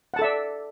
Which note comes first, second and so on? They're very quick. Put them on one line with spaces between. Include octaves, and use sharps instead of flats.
F#5 A5 A4 E5 D5